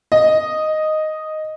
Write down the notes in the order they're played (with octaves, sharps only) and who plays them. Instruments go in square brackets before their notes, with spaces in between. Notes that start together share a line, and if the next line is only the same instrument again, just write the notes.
[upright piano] D#5